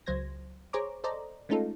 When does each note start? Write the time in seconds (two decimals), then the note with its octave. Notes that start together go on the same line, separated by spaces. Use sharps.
0.06 C#2 F#3 C5 G#6 A#6
0.73 G#4 C5 C#5 A#5 D6
1.04 A4 C5 D5 D#5 A#5
1.49 G#3 A3 C#4 D#4 F4 A4